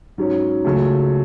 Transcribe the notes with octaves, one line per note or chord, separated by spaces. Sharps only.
G#2 F#3 C#4
C#2 C#3 F#3 A3